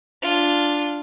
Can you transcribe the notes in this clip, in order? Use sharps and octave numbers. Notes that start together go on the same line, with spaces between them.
D4 F4